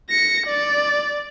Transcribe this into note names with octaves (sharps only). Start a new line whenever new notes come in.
A#6 C#7
D5